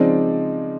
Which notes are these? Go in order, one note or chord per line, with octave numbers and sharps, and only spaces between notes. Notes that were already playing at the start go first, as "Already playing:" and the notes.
Already playing: C#3 F3 G#3 C4 D#4 D5